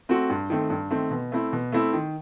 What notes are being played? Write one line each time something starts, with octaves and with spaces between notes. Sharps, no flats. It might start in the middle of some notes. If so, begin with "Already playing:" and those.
A3 C4 F#4
G2
D#3 A3 C4
G2
D#3 A3 C4
B2
A3 C4 E4
B2
A3 C4 E4
D#3